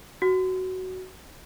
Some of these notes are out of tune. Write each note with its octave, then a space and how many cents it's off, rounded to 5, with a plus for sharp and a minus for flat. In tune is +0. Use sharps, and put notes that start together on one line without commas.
F#4 +10